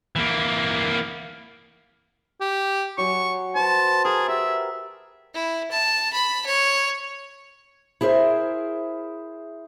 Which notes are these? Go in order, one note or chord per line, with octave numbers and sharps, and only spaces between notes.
E3 A#3
G4
F#3 G#5 C#6
B4 C5 A5
G#4 A#4 A5
G4 E5
E4
A5
B5
C#5
E4 G#4 A#4 C5 E5